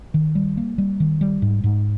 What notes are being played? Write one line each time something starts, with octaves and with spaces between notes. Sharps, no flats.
D#3
G3
A#3
G3
D#3
G3
G#2
G#2